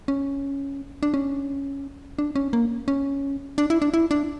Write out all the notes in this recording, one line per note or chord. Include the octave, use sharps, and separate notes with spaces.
C#4
D4
C#4
D4
C#4
A#3
C#4
D4
E4
D4
E4
D4